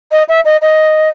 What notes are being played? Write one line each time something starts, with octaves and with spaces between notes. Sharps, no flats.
D#5
E5
D#5
D#5